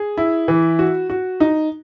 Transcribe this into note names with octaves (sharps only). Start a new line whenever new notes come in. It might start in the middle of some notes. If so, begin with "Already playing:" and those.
Already playing: G#4
E4
E3
F#4
F#4
D#4